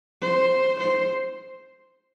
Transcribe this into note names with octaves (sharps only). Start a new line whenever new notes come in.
C5
C5